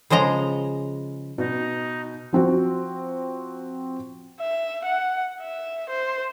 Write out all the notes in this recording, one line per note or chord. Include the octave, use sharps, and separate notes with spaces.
C#3 F3 G#3 D#5 A#5
B2 D#4
F3 C4 F#4
E5
F#5
E5
C5